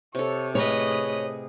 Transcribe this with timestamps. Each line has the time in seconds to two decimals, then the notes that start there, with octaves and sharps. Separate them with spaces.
0.15 C3 A4 C#5
0.55 A2 G#4 B4 C#5 D#5